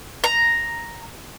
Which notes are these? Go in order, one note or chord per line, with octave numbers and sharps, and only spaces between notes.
A#5